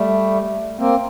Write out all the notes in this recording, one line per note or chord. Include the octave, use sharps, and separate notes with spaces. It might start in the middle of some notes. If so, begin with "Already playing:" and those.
Already playing: G3 A3
A#3 C4